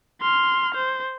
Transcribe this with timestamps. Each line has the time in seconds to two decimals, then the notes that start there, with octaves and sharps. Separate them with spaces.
0.21 C6 F6
0.75 C5